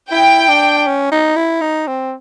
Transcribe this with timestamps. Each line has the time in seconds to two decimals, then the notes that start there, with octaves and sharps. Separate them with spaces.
0.11 E4 G5
0.48 D4
0.87 C#4
1.12 D#4
1.36 E4
1.61 D#4
1.87 C4